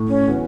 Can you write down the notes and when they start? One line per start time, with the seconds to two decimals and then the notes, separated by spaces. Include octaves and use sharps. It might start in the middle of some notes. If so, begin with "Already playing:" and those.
Already playing: A2 A3
0.08 C#4
0.28 E3 B3 F#4